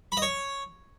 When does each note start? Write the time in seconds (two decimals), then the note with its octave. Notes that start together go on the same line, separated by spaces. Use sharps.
0.12 B5
0.17 D#5
0.22 C#5